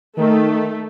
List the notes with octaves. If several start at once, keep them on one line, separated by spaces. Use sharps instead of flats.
D#3 A3